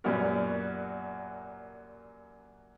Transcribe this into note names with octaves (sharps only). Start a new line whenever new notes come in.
F#2 A#2 G3 B3 F#4 A#4